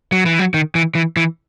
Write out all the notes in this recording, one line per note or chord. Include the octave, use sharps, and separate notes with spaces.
F#3
E3
F#3
D#3
E3
E3
E3